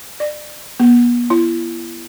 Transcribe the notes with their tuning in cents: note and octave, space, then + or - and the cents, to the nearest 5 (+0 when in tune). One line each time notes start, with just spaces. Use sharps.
D5 +30
B3 -40
E4 +35